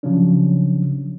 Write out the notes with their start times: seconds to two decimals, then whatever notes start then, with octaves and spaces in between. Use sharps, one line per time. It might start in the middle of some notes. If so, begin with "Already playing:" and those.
0.03 C#3 F3 F#3 C#4 D4